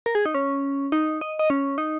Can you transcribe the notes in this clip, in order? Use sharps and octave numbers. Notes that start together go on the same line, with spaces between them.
A#4
G#4
D#4
C#4
D#4
D#5
D#5
C#4
D#4